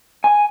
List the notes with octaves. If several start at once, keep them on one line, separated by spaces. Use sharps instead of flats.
G#5